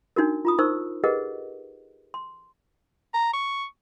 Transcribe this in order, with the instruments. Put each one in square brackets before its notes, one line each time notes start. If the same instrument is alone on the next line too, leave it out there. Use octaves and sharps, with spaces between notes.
[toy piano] D4 D#4 F#4 A#4
F4 B5 D#6
D#4 A#4 C5 C#6 E6
G4 G#4 A#4 B4 D#5 F#5
C6
[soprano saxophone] A#5
C#6